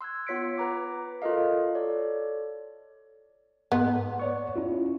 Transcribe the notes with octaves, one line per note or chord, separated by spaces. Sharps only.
C6 E6 F#6 G#6
B3 F4 C#5 B6 C#7 D7
B4 A#5 D6
F4 F#4 A4 A#4 D#5 F5
A4 C#5 D5
G#2 B3
C#5 D5 C#6
C#4 E4 F4